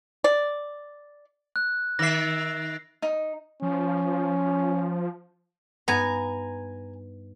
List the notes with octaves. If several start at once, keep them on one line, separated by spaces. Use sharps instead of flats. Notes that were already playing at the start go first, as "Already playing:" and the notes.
D5
F#6
D#3 E5 A#6 C7
D#4
F3 C#4
G2 B3 D#4 G#5 A#5 A#6